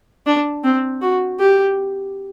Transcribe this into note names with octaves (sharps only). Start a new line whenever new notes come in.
D4
C4
F#4
G4